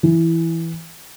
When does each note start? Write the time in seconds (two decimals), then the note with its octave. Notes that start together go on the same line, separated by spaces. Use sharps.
0.03 E3